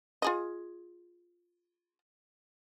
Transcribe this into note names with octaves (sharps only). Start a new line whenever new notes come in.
F4 G#4 D#5